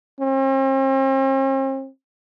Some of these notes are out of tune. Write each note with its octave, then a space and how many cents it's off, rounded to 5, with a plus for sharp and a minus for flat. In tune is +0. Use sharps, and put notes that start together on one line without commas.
C4 +45